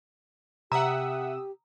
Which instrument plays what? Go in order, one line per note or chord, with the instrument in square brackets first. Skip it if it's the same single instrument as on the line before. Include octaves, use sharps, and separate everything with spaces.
[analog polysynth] C3 D#6 E6 [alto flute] G4 [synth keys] E5 F#5 [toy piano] A#5